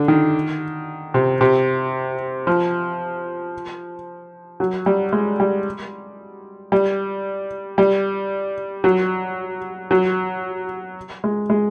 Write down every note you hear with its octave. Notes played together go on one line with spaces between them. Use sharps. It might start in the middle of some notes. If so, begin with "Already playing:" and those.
Already playing: D3
D#3
C3
C3
F3
F#3
G3
G#3
G3
G3
G3
F#3
F#3
G#3
G#3